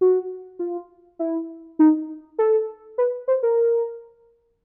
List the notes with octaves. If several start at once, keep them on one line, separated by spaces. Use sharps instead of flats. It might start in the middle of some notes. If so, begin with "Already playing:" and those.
F#4
F4
E4
D#4
A4
B4
C5
A#4